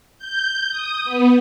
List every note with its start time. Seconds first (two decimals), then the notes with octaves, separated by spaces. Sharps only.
0.18 G6
0.70 D#6
1.05 B3